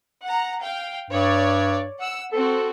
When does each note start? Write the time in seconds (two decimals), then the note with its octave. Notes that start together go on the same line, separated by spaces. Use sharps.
0.23 F#5 A#5
0.62 F5 G5
1.10 G2 C#5 D5
1.99 F#5 E6
2.32 C4 F#4 A4